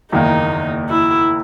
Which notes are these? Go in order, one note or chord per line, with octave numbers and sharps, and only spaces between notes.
F#1 E2 D#3 A#3 D#4
E4